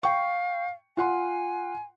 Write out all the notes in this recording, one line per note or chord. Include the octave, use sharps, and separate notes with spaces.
F5 G5 C#6
F4 F#5 G#5 C6